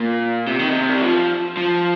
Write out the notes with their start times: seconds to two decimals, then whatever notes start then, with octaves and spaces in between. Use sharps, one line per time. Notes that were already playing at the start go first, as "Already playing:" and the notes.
Already playing: A#2
0.46 C3
0.59 D#3
0.71 C3
0.89 G3
1.01 F3
1.57 F3